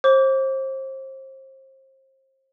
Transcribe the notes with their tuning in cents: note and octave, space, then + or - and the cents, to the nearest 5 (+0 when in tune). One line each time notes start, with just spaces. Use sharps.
C5 +35 D6 -25